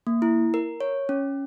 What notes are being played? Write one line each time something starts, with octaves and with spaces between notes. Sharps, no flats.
A#3
E4
A#4
C#5
C#4